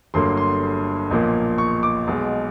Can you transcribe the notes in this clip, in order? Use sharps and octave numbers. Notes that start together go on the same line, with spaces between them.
G1 G2 D3 F#3 A#3 C6
C6
B1 A#2 F3 A#3
C#6
D6
B1 B2 G#3